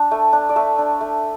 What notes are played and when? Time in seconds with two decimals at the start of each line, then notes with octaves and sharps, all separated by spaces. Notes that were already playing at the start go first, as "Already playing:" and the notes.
Already playing: D4 A5
0.11 A3
0.33 D4
0.49 D5
0.56 A3 E5
0.78 D4
1.01 A3